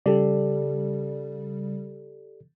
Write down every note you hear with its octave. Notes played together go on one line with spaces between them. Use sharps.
C#3 G3 G4 A4 D5